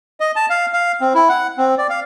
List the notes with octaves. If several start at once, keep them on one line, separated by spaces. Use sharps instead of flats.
D#5
A5
F5
F5
C4
E4
F#5
C4
D5
F5